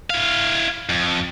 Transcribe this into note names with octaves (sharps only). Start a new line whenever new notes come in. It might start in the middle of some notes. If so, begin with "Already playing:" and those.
E4 F5
F2